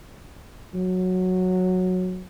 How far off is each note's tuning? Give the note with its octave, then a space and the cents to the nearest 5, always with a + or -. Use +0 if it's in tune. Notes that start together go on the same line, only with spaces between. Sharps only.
F#3 -10